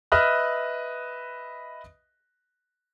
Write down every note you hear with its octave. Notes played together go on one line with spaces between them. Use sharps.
B4 D#5 E5 D#6 F6 F#6